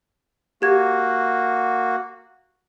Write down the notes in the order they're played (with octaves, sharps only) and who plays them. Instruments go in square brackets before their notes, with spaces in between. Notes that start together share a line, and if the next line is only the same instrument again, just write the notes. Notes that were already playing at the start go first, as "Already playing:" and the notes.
[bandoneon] A#3 F#4 [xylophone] G4 G#6